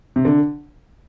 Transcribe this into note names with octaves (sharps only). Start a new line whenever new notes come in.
C3
D3